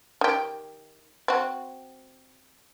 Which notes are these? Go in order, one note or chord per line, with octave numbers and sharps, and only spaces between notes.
D#3 G4
C4 F#4